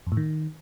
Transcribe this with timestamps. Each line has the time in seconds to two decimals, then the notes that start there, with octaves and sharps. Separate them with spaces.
0.07 F2
0.12 A2
0.17 D#3